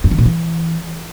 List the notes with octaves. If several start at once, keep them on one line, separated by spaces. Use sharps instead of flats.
G2
D#3
A#2
E3